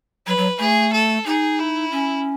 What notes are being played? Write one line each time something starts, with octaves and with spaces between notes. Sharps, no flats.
F#3 B4
F#3
A3 G#4
A4
D#4 G#4
E4
C#4